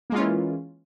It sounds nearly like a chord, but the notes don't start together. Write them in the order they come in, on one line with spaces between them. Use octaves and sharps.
A#3 G#3 F4 C#4 E3